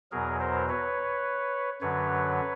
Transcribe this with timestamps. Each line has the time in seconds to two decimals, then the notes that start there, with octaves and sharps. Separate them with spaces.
0.11 E2 B2 F#3 G#4 A#4
0.40 A#4 C5
0.68 B4 C#5
1.81 F#2 D3 F#3 B4 C#5